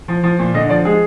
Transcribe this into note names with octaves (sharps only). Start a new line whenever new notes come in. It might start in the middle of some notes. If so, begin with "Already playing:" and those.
F3
F3
A#2
D3 D#5
F3 D5
G#3 G#4